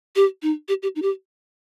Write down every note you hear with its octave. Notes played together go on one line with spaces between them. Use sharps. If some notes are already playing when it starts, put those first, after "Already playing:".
G4
D#4
G4
G4
D#4
G4